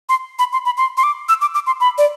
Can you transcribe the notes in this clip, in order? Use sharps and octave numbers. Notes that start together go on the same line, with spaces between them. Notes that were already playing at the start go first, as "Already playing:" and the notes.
C6
B5
C6
B5
C6
C6
D6
E6
D6
D6
C6
B5
D5